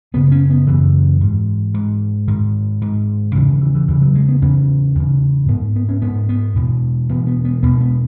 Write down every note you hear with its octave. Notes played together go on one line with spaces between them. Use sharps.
F#2 C#3 B3
C#4
B3
F#2 C#3 E3
G#2
G#2
G#2 D#3
G#2
E2 C#3 E3
D#3
E3
E3
E2 C#3 E3
F#3
G#3
B3
E2 C#3 C#4
E2 C#3
G#2 B3
B3
C#4
G#2 B3
B3
E2 B2
E2 B2 B3
B3
B3
E2 B2 B3
B3